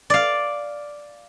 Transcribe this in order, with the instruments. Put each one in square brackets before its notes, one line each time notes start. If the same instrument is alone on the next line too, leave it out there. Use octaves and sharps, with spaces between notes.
[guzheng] D5 F5